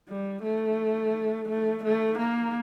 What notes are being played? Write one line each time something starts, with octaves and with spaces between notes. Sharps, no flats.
G3
A3
A3
A3
A#3